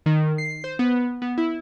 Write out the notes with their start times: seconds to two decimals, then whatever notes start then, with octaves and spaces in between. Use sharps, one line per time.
0.06 D#3
0.38 C7
0.64 C5
0.79 B3
1.22 B3
1.38 E4